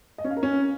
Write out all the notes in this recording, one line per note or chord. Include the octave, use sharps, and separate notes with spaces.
D#5
C#4
F5
A#4
C#4